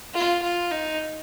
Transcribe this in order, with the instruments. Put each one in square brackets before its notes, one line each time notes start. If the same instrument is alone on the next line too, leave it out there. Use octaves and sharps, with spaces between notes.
[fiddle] F4
F4
D#4